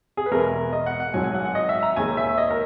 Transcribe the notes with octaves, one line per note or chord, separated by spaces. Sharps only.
G#4
B4
E2 B2 G#3 A#4
D#5
F#5
F#5
G#1 G#2 F#3 G#5
G#5
F#5
F#5
D#5
E5
A#5
D#2 D#3 G#3 G#5
E5
D#5
A#4